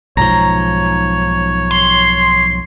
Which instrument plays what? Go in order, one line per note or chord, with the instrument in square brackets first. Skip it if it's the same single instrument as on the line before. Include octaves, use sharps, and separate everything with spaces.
[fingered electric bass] B1 G#2 F3 [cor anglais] C#5 [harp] A#5
[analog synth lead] C6